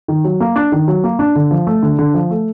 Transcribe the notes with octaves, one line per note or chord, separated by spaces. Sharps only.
D#3
F#3
A#3
D4
D#3
F#3
A#3
D4
D3
F3
A3
D3
D3
F3
A3